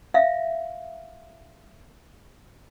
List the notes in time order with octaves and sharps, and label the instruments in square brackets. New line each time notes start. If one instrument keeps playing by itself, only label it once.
[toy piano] E5 F5